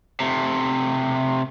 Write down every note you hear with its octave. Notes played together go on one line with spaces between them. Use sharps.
C3 A3